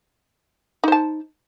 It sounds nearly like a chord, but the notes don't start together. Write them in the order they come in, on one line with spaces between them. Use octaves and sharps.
D#4 C5 A5